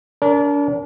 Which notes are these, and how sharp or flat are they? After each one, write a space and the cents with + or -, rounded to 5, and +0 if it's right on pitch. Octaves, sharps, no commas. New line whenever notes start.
D4 -35 A#4 +0